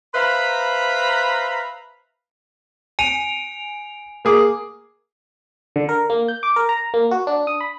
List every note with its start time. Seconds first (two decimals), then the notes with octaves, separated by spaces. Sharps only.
0.15 B4 C5 E5 F5 A#5 B5
2.99 G#5 D7 D#7 F7
4.25 A#3 G#4 D6
5.76 D3
5.89 A#4
6.10 A#3
6.28 G6
6.43 D6
6.56 A#4
6.69 A#5
6.94 A#3
7.11 F#4
7.27 D4
7.47 D#6
7.61 B5